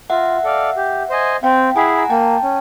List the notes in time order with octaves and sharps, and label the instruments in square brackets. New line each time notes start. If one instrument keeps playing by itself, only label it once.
[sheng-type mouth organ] F4 [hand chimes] E5 F#5
[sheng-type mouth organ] A4 D5 F5
G4
C5 D#5 G#5
[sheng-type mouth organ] C4 [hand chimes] F5 G5
[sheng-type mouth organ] E4 G#4 [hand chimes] F#5 G#5
[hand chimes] A#5
[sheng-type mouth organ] A#3 [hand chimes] G5 A5
[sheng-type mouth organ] C#4